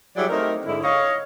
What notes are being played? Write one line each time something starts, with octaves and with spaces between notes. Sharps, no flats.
F#3 G3 E4 G4 G#4 D5
A3 C4 D#4 A#4
G#2 D3 G#3 E4
C#5 D#5 F5